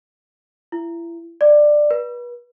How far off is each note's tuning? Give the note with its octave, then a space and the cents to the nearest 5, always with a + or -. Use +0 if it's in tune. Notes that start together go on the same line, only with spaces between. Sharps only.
E4 +30
D5 +15
B4 -35